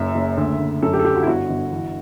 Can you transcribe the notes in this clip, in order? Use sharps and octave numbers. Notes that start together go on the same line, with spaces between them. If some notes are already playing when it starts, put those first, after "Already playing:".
Already playing: F#1 F#2 E5
F#1
D2
D2
F#2 A4
G4
A4
D3 G4
F#4
E4
G1 F#4
G1
E3